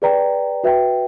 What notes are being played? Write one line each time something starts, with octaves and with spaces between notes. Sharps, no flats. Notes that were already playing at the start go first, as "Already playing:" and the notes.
G#4 B4 D5 G5 A#5
F#4 B4 E5 G5